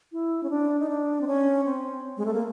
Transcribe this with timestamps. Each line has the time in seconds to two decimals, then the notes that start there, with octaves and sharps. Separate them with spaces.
0.12 E4
0.43 C#4
0.50 D4
0.80 D#4
0.89 D4
1.21 C4
1.27 C#4
1.65 C4
2.17 G#3
2.26 A3
2.33 A#3